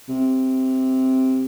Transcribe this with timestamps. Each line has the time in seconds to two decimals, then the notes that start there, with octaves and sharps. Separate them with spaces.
0.09 C3